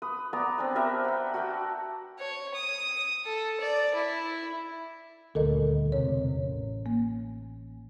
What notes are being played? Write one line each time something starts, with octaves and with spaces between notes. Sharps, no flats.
B4 D#6
B3 D5 A#5 D#6
C4 D4 B4
G4 A#4 B4 E5
F#5 G5
F#4 F#5 G5 A5
C#5
D#6
A4
D5
E4
D#1 D2 A4 A#4 D#5
E1 C3 C#5
A1
A#3